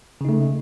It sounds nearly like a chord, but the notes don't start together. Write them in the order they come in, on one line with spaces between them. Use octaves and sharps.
C#3 D#4 A3